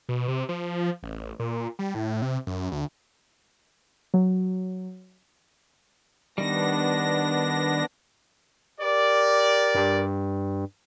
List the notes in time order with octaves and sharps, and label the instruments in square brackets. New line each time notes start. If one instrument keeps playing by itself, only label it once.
[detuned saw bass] B2
C3
F3
A1
A#2
G3
A2
C3
F#2
D2
[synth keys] F#3
[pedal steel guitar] D#3 G3 [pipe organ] B3 D4 A#6
[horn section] G4 A#4 D5
[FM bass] G2